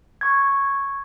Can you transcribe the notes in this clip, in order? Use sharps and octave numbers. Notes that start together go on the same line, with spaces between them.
C#6 G#6